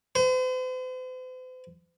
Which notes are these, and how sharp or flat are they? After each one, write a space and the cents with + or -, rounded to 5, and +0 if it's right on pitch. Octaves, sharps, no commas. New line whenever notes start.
C5 -45